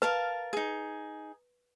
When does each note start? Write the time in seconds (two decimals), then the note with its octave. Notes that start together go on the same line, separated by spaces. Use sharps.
0.02 A#4 B4 F5 A5
0.53 D#4 G#4